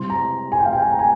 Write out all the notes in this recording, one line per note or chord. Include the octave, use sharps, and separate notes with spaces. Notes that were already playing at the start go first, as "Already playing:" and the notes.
Already playing: C3 G3 C4 E4 C6
A#5
G#5
G5
F5
G5
G#5
A#5
G#5